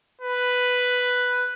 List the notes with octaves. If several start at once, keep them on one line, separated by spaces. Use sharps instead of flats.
B4